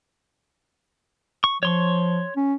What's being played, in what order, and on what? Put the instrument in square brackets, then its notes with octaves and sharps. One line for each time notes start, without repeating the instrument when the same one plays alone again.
[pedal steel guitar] C#6
[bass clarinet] F3 [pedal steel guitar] C#5 C6 C#6
[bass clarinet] C#4